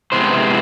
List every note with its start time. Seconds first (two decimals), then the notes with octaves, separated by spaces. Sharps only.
0.12 C3 E3 G#3 B3 C5